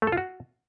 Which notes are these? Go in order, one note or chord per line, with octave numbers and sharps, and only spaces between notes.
A3
A4
F4
F#4